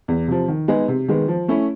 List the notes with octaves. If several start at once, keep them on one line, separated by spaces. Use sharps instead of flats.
E2
C3 F3
D#3
G#3 B3 D#4 G#4
C3
D#3 G#3 B3
F3
A3 C#4 E4